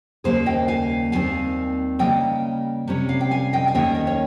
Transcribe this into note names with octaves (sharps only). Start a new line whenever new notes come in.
D#2 C#3 G3 A#3 G#4 C5
D#5 G5
F5 G#5
D#2 D#3 G3 C4 F5 G#5
C#3 G3 A#3 D#5 G5
C3 G3 C#4
F5
G5
F5 G#5
D#5 G5
G#5
D#2 D#3 A#3 C#4 D#5 G5
D#5
C#5